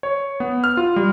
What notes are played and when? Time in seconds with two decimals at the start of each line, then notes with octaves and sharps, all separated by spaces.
0.03 C#5
0.40 B3
0.64 F6
0.77 F4
0.96 G3